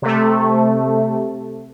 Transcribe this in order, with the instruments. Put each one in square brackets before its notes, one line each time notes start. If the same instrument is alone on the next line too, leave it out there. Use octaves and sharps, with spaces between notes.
[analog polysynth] C3 A3